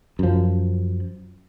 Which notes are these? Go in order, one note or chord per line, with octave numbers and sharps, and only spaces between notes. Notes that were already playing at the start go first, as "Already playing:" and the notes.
F#2 F3